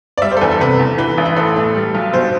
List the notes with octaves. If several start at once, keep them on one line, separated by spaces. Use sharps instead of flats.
D5
G3 E5
C5
A4
E2 B4
A4
C3 B4
E2
E3 B4
A1
B4
A2 A4
A3
G3
B1
B2 C5